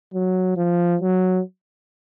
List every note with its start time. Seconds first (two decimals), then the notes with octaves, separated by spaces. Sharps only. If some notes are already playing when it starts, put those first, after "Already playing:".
0.14 F#3
0.57 F3
1.02 F#3